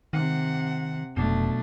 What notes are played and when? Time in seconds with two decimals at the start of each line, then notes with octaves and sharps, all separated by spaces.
0.13 C3 D#3 F#5
1.17 F1 B1 B2 A3 D4